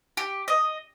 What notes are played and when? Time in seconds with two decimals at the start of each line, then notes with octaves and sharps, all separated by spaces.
0.17 G4
0.48 D#5